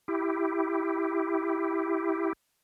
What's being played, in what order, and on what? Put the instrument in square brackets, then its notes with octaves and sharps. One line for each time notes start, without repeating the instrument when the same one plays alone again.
[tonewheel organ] E4 G4